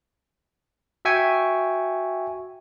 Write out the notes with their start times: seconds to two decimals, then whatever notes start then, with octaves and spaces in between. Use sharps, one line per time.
1.05 F#4 E5 G5 G#5 C#6